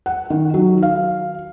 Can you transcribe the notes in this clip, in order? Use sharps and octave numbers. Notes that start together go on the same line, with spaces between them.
F#5
D#3
F#3
F5